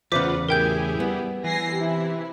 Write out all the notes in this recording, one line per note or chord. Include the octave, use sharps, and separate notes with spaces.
E2 C#3 F4 B4 C5 F#5 D6 B6
A2 E4 G4 G#4 A#4 G5 G#5 G6
G3 B3
E3 G#5 A#6 C7
C3 E4